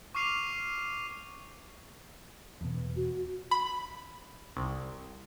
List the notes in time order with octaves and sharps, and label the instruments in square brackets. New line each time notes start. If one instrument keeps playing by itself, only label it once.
[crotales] C#6 D6 F6 C7 D#7 F7
[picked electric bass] E2 B2
[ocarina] F#4
[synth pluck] B5
C2